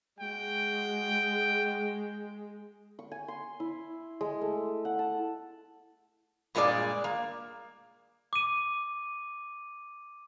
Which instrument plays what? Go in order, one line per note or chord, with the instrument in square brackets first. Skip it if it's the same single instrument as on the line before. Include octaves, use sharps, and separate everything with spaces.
[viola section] G#3 [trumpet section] F#4 G5
[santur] C#6
G#5
C6
E4
G#3
A3
F#5
A5
[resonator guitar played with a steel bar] G2 A#2 G#3 G4 D5
A#3
[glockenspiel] D6 D#7